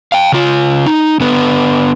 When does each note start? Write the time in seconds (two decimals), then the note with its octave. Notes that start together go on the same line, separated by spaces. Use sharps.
0.12 F5 G5
0.32 C#3 F4
0.86 D#4
1.20 D3 B3 B4